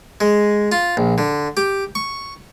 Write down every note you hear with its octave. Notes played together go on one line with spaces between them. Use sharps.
G#3
F4
A#1
D3
G4
C#6